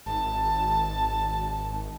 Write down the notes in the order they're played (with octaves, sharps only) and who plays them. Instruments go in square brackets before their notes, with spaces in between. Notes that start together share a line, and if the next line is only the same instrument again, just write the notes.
[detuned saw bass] G#1 [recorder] A5